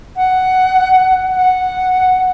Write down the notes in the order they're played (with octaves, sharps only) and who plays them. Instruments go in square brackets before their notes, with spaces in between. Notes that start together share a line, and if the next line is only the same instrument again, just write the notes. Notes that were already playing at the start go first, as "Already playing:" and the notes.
[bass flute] F#5
F#5